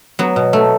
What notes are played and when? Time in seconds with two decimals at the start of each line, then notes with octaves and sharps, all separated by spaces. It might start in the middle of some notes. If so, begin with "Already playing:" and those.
0.19 F#3 B3
0.36 B2
0.53 A3